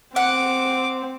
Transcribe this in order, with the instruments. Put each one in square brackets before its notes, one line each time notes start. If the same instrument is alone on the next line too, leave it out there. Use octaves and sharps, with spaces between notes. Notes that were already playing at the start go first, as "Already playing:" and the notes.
[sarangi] C4 [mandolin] F#5 [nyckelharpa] D6